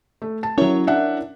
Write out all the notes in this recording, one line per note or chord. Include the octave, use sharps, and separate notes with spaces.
A3
A5
F#3 C#4 E4 A#4 C#5
D4 E5 F#5